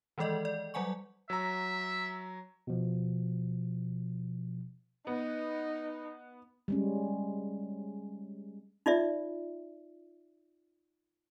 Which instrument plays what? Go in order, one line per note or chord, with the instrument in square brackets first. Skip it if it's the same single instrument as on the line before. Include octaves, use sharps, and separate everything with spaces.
[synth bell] D#3 E3 G#3 A4 D5 D#5
D5
F#3 G3 F#5 G#5 C#6
[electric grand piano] F#3 A#5 [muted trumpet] E5
[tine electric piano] B2 F3
[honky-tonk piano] B3 [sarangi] D#4
[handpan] G3 G#3 C#4
[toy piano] D#4 F4 D5 E5